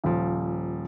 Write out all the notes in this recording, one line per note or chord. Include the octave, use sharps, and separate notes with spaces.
D#1 F3